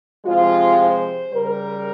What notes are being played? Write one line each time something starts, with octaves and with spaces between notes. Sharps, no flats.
C3 F3 G#3 F4
C5
C#3 G3 A#4